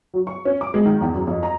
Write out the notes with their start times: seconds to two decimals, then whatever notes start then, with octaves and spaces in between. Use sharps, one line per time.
0.14 F#3
0.27 C#6
0.45 C#4
0.61 D6
0.74 G#3
0.85 D#3
1.01 E2
1.14 F#2
1.27 F2
1.43 A#5